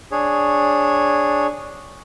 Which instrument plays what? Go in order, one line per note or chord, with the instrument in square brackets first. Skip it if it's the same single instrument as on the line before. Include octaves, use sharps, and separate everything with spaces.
[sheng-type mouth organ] D4 G#4 C#5